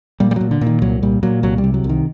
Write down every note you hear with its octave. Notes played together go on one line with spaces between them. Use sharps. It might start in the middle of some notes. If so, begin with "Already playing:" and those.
A#2 G3
G3
A#2 F#3
D3
A#2
D#3
C2 F#3
A#2 G3
A#2 F#3
C2 F#3
G3
C3
F#3
C2
D#3